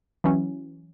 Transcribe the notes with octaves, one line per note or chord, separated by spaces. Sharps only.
E3 F#3 C#4